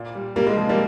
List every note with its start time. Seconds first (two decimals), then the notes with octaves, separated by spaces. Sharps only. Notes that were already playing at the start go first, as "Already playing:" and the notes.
Already playing: A#2 A#3
0.15 G3
0.36 C3 G3 A#3
0.47 G#3
0.57 F3 G#3
0.69 G3 A#3